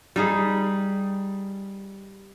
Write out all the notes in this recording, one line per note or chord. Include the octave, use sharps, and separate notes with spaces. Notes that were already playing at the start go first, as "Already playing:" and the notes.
G3 D#4 G#4